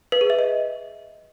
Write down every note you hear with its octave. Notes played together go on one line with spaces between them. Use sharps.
B4
G#4
E5
D#5